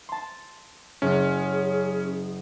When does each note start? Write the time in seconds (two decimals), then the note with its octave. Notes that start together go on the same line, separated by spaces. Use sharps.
0.09 A5 C6
1.02 F#1 C#4 G#4